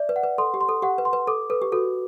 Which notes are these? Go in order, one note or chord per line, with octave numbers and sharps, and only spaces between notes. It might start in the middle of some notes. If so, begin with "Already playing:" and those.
Already playing: D5 E5
B4
F#5
B4
A4 C6
G4
C6
A4
G4 F#5
B4
C6
B4
A4 D6
A4 B4
G4
F#4 A4